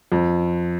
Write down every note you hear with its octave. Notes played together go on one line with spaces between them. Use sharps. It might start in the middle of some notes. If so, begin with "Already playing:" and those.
F2